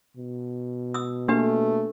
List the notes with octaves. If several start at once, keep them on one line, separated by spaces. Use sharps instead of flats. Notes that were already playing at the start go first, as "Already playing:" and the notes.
B2
D#6 E6
A3 A#3 D4 G4 B4